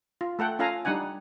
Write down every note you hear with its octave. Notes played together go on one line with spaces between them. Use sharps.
F4
A3 A4 F#5 G5
C#4 F4 A4 F5 G#5 A#5
G3 D4 D#4 F#5 G#5